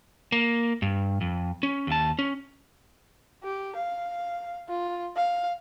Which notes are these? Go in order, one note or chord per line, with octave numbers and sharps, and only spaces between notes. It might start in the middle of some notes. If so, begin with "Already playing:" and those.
A#3
G2
F2
C#4
D#2 A5
C#4
G4
F5
F4
F5